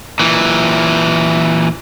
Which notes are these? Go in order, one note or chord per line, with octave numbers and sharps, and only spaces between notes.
A#2 E3